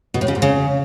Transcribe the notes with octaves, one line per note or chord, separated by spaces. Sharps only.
B2
A2
C#3
G#2
C#3